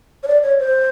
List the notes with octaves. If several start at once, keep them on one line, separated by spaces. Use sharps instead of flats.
C#5
D5
C#5
C5